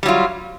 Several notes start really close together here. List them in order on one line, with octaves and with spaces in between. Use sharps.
G3 F#3 F4